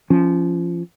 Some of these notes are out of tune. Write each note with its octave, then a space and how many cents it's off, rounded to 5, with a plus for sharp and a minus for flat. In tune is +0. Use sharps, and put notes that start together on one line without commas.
F3 -20 C#4 +0